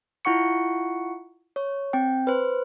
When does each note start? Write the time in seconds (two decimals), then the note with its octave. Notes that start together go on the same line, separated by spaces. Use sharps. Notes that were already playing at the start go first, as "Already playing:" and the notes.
0.25 E4 F4 F#5 C#6 C#7
1.56 C#5
1.93 C4 G5
2.27 B4 C5